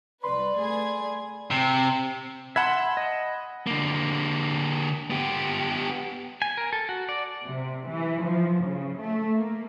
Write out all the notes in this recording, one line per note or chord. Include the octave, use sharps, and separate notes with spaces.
C2 B4 D5 B5 C6
A3 G#4 G#6
C3
E5 F#5 A5 B5 C6 G#6
D#5
D3 A#3
B3 G4
G#5
A#4
A4
F#4
D5
C3
E3
F3
C#3
A3
A#3